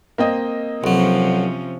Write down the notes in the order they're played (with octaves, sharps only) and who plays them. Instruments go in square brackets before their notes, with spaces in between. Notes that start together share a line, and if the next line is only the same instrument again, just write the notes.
[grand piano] A#3 C4 D#5
[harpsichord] B1 F#3 [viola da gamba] C3 F3 C#4